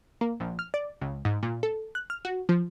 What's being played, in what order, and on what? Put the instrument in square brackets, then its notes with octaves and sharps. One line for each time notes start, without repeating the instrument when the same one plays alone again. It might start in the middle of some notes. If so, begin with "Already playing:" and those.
[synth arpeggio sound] A#3
A#1
F6
D5
C#2
G#2
A#2
A4
F#6
F6
F#4
F3